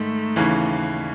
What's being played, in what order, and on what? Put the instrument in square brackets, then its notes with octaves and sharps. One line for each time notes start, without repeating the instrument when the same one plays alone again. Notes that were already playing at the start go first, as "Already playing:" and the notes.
Already playing: [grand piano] G#2 D#3 [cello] A3
[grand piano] D#2 C#3 E3